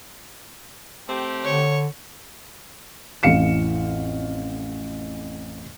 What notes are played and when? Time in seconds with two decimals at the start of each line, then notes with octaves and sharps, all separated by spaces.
1.07 A3 C4 G4
1.44 D3 C#5
3.23 A1 F2 E3 F5 C#7 E7